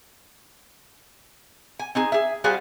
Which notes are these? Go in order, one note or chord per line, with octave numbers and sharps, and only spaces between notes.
G#5
C4 D#4 G#4
G#4 E5
G3 F#4 G#4 C5 F5 G#5